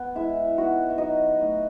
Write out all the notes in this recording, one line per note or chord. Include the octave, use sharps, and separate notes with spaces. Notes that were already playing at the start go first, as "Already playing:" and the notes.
Already playing: B3
G#3 E4 E5
B3 D#4 F#4 F#5
E5
F#3 D#4 D#5
A3 D#4